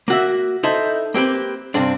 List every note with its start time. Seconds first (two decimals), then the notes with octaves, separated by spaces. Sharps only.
0.08 A#3 F#4 E5
0.63 D#4 E4 A4 C5
1.14 A#3 C4 G4 B4
1.74 G2 C3 C4 D4